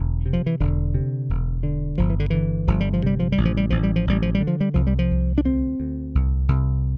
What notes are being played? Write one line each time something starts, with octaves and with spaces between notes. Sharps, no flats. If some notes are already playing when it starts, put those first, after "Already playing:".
Already playing: E1 D3
C3
F3
E3
E1 D3
C3
E1
D3
G1 F3
E3
D3
D3 E3
G1 F3
G3
F3
C3 G3
F3
G3
A1
F3
G3
A1 F3
G3
F3
A1 G3
F3
G3
D3
F3
G3
C2 F3
G3
F3
C2
D4
D2 C4
D2
C2
C2